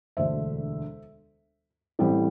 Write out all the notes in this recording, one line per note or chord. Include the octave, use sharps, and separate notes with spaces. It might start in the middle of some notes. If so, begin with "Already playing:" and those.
E1 D2 D3 C5 E5
A1 A2 G3 C4